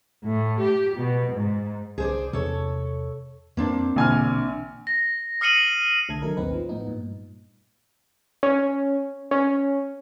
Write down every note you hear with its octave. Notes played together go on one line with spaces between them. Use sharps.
A2
G4
B2
G#2
C2 C#4 G#4 C5 D5
E2 C3 A4 C#5
F2 A#3 C4 D4
A#1 B2 D3 E3 G#5 F6
A#6
D#6 F6 C7 C#7 D#7 F#7
C2 D3 A3 A4 G#6
D3 D#3 F#3 A3 D#4 A#4
A1 D#2 C4 D#4 B4
F3
A2 B3 D#4
G2 A#2
C#4
C#4